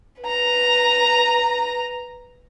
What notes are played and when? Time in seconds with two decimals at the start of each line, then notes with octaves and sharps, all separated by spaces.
0.22 B4 A#5